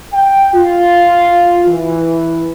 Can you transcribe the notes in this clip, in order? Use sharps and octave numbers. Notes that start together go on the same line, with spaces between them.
G5
F4
E3